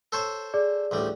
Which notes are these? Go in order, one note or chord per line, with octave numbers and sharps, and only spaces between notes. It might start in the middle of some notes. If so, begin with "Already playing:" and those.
A4 C5 C#5
G#4 D5
A1 D2 G3